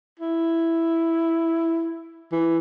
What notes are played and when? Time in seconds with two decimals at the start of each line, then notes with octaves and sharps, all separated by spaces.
0.20 E4
2.32 E3